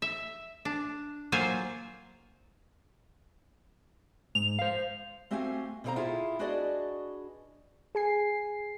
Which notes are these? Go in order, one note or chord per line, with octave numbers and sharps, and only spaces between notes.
E5
D4
F#3 A#3 F4 C5 G#5
G#2 F7
C5 F5
A3 C4 F#4 G4 F5 G#5
B2 D3 C4 C#5 F5 A#5
E4 F4 G4 G#4 F5
D4 F#4 G#4 B4 D5 D#5
G#4 G#5 C7